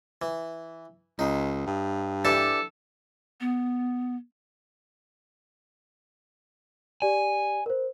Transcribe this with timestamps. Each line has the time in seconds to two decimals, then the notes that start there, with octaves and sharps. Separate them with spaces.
0.22 E3
1.19 C#2 D#4
1.66 G2
2.25 E3 D4 G4 A4
3.40 B3
7.02 G4 D5 G#5
7.66 A#4 C5